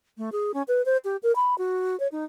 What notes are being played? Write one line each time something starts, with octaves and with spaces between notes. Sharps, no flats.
A3
G#4
C#4
B4
C5
G4
A#4
B5
F#4
C#5
D#4